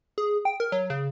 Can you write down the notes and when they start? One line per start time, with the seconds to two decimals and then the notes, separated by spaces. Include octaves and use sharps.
0.18 G#4
0.45 G5
0.60 A#4
0.72 F#3
0.90 C#3